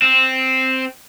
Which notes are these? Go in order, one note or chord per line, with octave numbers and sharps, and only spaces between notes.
C4